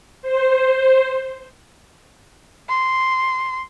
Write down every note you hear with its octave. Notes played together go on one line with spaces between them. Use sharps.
C5
C6